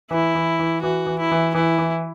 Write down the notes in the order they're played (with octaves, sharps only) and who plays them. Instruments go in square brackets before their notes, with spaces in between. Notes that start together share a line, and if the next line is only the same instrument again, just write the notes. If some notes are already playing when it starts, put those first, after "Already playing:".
[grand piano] E3 [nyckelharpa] E4
[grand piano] E3
E3
[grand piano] E3 [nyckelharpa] F#4
[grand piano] E3
[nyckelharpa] E4
[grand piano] E3
[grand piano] E3 [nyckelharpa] E4
[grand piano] E3